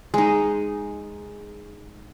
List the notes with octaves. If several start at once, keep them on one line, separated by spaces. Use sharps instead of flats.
G#3 D#4